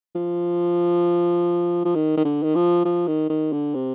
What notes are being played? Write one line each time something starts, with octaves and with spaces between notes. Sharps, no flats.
F3
F3
D#3
D#3
D3
D#3
F3
F3
D#3
D#3
D3
C3